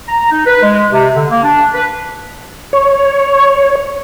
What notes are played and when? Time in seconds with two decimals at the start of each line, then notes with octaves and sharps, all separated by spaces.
0.07 A#5
0.31 D#4
0.46 B4
0.62 G#3
0.91 C3
1.15 D3
1.30 A#3
1.44 D4
1.73 B4
2.73 C#5